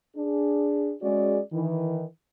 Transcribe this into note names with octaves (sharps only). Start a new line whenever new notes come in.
D4 G#4
G#3 C#4 F#4 G#4 D5
D#3 E3